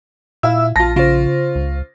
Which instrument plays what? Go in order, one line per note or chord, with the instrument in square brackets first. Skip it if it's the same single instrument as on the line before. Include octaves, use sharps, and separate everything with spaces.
[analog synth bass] A#2 [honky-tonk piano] E4 [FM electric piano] E5 F5 E6
[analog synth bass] A#1 [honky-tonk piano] F4 A#6 [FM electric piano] A5
[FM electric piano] C#3 C5 [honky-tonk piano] F4
[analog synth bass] C#2